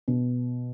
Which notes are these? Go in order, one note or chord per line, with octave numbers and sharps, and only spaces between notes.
B2